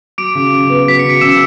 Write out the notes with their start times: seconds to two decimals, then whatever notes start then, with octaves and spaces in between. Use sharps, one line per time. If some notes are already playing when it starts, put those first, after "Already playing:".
0.18 F#3 D6 D7
0.35 C#3
0.53 C#3
0.70 B3
0.88 F#3 B6
0.99 C#3 C#7
1.10 D7
1.21 C#3 E6 E7